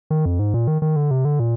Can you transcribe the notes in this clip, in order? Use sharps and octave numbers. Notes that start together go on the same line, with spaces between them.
D#3
F2
G#2
A#2
D#3
D#3
D3
C3
D3
A#2